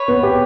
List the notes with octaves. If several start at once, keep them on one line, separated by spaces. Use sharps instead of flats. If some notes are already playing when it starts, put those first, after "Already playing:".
Already playing: B4 C#5
B3
G4